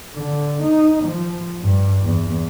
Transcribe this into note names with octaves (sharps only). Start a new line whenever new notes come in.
D3
D#4
F3
G2
E2